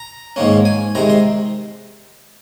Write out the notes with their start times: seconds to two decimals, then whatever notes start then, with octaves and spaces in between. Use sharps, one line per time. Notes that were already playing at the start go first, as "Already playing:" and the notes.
Already playing: A#5
0.36 G#2 D#3 A#3 C#4
0.65 G#5
0.95 C3 D#3 G#3 A#5
1.10 C6